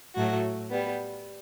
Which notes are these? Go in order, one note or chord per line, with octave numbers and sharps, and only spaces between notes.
A2 F#3 A3 F#4
G3 B3